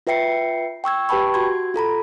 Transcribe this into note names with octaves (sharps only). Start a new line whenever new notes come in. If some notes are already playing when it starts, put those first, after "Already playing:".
F4 B4 E5 G5 C7 C#7
G5 C#6 E6 G#6
G4 B4 G5 A5 B5 C#6
F#4 C6 G#6
F4 A4 A#5 B5